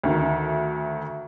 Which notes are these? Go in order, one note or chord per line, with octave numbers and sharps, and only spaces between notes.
D2 D#3